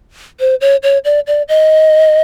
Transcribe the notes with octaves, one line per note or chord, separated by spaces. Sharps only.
C5
C#5
C#5
D5
D5
D#5